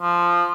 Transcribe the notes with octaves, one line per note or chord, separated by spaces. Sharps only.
F3